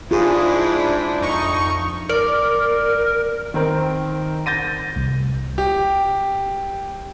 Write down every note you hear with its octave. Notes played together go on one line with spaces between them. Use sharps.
G#2 D4 E4 F4 G#4
F2 D#4 C#6
A#4 D5
D#3 C4 A#4
G6 A6 A#6 D#7
C2
G4